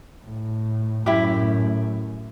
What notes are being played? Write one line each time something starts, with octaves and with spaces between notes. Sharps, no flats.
A2
F#2 A2 E4 G4